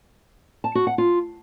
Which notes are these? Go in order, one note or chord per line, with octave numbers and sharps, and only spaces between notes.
A5
F#4
F#5
F4